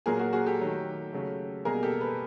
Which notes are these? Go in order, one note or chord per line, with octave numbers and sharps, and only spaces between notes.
A#2 F#3 A#3 G#4 A#4
F#4 G#4
F#4 G#4
G4 A4
D#3 F#3 A3
C#3 F#3 A3
B2 G3 A#3 G#4 A#4
G4 A4
A4 B4